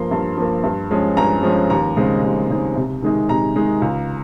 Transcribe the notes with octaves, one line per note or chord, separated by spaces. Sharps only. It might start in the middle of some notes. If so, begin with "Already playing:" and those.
Already playing: G2 F3 A#3 A#5 C6
G2
F3 A#3
G2
F3 G#3 C#4
G2 A#5
F3 G#3 C#4
D#2 A#5
C#3 G#3 C4 D#4
D#2
C#3 G#3 C4 D#4
C3
D#3 G#3 D#4
C3 A#5
D#3 G#3 D#4
C#2